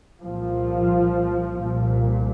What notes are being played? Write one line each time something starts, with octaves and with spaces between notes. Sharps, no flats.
C2 A#2 F3
C2 A#2